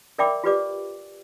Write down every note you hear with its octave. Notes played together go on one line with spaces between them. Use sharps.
A#4 D5 E5 G5 B5 D6
F4 G4 B4 D5 D6